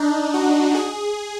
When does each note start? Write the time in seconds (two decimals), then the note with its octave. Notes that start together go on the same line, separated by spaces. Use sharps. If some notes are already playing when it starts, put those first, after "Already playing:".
Already playing: D4 D#4
0.34 F#4
0.75 G#4